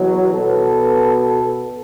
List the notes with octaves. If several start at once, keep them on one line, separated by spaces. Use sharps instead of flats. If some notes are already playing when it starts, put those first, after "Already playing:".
Already playing: E2 B2 F#3
B2 B3 A4